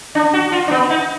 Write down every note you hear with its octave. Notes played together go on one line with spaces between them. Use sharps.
D4
F#4
F4
D4
B3
D#4